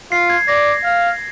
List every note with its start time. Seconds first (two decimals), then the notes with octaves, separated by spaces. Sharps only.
0.11 F4 C7
0.30 G#6
0.48 D5 A#6
0.84 F5